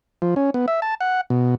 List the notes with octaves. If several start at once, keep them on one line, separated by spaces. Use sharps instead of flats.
F3
C#4
B3
E5
A5
F#5
B2